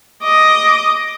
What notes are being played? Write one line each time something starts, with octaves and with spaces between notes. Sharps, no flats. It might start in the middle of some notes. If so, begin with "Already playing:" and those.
D#5 D6